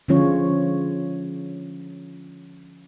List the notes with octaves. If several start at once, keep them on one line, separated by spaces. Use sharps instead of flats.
D3 F3 G#3 C#4 F4 C#5